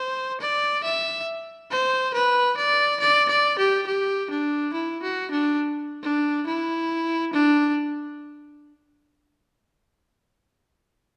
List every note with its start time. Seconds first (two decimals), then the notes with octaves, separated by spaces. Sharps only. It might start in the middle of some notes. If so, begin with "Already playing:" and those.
Already playing: C5
0.41 D5
0.84 E5
1.71 C5
2.14 B4
2.57 D5
3.00 D5
3.29 D5
3.59 G4
3.87 G4
4.30 D4
4.74 E4
5.03 F#4
5.31 D4
6.03 D4
6.47 E4
7.33 D4